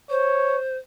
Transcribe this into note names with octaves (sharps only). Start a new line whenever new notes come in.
C5 C#5